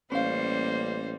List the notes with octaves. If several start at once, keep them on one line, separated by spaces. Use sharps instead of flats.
A1 G3 A#3 C#4 C5 F5